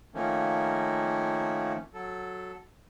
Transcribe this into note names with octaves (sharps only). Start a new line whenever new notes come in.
D#3 F3 A3 A#3 C#4
F#3 A4